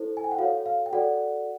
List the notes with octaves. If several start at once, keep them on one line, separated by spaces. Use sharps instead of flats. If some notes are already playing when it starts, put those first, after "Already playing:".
Already playing: E4 A4 C5
G#5
G5
F#5
F#4 A4 C#5 F5
F5
G5
F#4 A4 D5 F#5